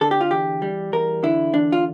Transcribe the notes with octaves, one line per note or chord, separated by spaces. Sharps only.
D3 A4
G4
F4
E2 G4
G3
E2 A#4
D3 E4
E2 D4
F4